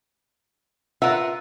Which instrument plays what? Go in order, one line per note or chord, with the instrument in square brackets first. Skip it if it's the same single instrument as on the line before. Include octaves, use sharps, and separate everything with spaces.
[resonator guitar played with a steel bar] F4 B4 F#5 [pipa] A#4 E5